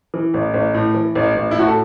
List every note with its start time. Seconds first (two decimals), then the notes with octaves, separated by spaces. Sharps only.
0.14 E3
0.34 A1
0.54 A1
0.74 A2
0.94 E3
1.15 A1
1.35 A1
1.51 E4
1.56 A2 F#4
1.67 A4